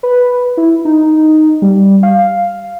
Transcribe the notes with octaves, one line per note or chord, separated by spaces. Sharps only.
B4
E4
D#4
G3
F5